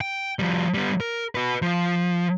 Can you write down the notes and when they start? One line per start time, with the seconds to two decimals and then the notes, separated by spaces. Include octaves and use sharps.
0.01 G5
0.39 F3 G3
0.74 G3 B3
1.00 A#4
1.35 F#4 B4
1.63 F3